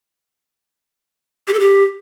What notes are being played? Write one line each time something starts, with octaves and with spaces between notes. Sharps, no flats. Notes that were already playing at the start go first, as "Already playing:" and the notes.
G4
A4
G4